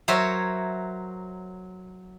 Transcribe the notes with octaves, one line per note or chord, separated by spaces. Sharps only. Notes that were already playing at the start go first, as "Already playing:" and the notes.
F#3 A#4 C5 C#5 E5